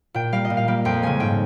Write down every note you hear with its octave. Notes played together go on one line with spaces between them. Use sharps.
A#2 G5
G3 A#3 F5
D#5
A#2
F5
G3 A#3
F2 G5
C#3 G#3 G#5
G#2 G5